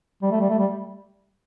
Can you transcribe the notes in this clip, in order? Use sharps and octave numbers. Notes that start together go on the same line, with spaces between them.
G3
A3
G3
A3
G3